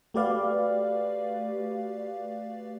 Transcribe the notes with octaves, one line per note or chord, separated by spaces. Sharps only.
A3 F#4 G4 B4 D5 F5